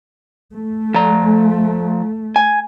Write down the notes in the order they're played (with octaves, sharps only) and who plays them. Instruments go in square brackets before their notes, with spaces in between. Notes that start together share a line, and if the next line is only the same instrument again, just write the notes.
[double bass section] A3
[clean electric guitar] F3 A#5
G#5